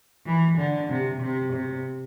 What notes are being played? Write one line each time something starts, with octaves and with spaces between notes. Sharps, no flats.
E3
D3
C3
C3
C3